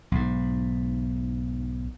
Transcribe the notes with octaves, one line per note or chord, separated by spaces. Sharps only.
B1 G#2